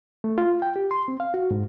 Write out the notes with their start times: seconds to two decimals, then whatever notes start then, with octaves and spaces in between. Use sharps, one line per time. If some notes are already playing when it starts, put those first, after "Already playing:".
0.24 A3
0.38 F4
0.62 G5
0.76 G4
0.91 C6
1.08 C4
1.20 F5
1.34 F#4
1.51 G#2